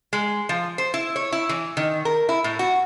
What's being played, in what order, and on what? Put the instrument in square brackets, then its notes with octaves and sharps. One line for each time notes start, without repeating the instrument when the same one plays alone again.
[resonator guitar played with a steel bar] G#3
F3
C5
E4
C#5
E4
E3
D#3
A#4
E4
A2
F#4